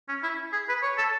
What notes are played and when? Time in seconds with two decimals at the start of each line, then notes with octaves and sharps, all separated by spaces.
0.09 C#4
0.23 E4
0.53 G#4
0.69 B4
0.83 C#5
0.97 A4